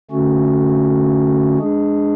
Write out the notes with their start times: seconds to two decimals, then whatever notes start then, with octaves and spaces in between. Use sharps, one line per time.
0.11 D3 A3 C#4 F#4
1.58 G#3 D4 G#4